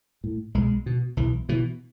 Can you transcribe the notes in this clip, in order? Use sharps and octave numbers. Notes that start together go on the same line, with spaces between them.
A2
B1 G#3
B2
B1 E3
B2 E3